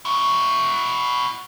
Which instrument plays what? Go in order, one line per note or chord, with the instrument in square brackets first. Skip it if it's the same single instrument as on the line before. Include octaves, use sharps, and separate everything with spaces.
[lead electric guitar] E4 F#4